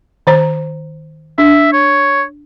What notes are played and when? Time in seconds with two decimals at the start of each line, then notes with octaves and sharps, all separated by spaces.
0.27 D#3 C5 A#5
1.38 D4 E5
1.73 C#5